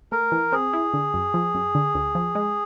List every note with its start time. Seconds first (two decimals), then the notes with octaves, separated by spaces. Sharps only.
0.12 A3 A#4
0.32 E3
0.52 C4 G#4
0.73 E4
0.93 D3
1.14 F#2
1.34 F3
1.54 F#2
1.75 D3
1.95 D2
2.15 F3
2.35 G#3